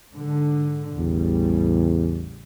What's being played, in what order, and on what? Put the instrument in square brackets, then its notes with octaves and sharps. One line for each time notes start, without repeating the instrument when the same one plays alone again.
[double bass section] G#2 D3
[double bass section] A1 C#3 G3 [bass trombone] E2